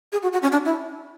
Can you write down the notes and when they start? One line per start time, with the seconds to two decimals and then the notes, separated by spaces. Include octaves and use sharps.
0.12 G#4
0.23 F#4
0.33 F#4
0.42 C#4
0.52 D4
0.65 E4